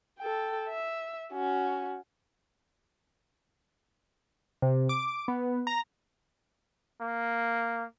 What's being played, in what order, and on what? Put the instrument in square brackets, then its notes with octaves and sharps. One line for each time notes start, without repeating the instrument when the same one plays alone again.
[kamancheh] A4 G5
E5
C#4 F#4
[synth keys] C3
D6
B3
A#5
[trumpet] A#3